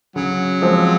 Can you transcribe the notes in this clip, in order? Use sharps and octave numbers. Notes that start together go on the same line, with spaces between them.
C#3 F#3
F3 G#3 C4